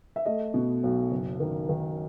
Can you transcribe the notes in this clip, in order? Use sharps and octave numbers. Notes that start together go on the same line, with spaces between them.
E5
A3 D#5
B2
B1
F#1
D#3
D#3